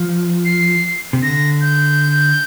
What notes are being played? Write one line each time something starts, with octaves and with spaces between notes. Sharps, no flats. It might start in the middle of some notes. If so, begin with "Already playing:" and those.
Already playing: F3
C7
C3
D3 A#6
G6